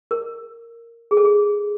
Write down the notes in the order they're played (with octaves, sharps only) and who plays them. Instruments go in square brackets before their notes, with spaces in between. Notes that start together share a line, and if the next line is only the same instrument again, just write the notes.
[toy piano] A#4
G#4
A4
G#4